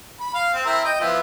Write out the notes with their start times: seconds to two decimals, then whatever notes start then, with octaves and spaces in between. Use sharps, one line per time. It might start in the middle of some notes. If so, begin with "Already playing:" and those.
0.20 B5
0.34 F5
0.54 C4
0.66 C4 E4 A#4
0.85 D#5 G5
1.00 F3 B3 E4